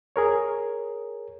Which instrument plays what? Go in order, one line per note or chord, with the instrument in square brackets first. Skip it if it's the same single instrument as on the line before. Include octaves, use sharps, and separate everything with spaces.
[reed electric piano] G#4 A#4 C#5